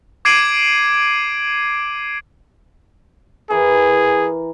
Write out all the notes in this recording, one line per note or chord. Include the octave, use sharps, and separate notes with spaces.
D6 G#6 C7 D7 D#7 F#7
E3 G#4 A#4